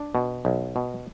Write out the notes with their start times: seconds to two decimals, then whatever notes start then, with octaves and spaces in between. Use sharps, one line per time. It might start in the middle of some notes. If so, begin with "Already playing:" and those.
Already playing: D4
0.15 B2
0.45 B1
0.76 B2